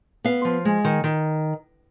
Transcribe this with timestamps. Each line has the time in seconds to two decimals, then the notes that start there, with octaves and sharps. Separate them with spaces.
0.24 B3 F5
0.45 F3
0.65 G#3
0.85 D#3
1.04 D#3